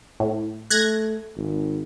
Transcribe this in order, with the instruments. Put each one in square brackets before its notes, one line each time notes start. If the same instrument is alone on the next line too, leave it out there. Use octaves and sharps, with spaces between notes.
[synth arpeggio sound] A2
[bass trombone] A3 [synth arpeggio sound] F#6 G#6 A#6
[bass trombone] G#1